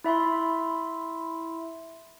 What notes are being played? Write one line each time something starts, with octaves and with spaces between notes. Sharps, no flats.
E4 E5 B5 C6